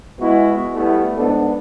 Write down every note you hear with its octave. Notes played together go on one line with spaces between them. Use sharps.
G#3 B3 E4 F#4
G3 A3 B3 E4
G#2 B3 D4 A4